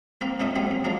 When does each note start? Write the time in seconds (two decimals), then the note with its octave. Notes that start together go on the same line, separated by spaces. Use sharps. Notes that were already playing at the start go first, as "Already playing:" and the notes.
0.21 A#3 C4 B4
0.40 A#2 A3 C#4 D#4 E5 D#6
0.56 G#2 F#3 G3 C4 B5
0.71 D#2
0.84 F3 F#3 G#3 A#3 D4